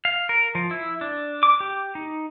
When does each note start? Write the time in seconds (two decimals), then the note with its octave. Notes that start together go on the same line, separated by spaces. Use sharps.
0.05 F5
0.29 A#4
0.55 F3
0.71 E4
1.01 D4
1.43 D6
1.60 G4
1.95 D#4